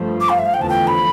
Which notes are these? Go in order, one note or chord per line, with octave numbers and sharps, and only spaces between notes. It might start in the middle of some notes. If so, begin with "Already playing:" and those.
Already playing: G2 F3 A3
D6
F5
E5
F5
E2 D3 F3 A3 G5
A5
G5
B5